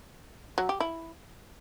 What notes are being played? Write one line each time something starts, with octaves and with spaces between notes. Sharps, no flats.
F#3
G4
E4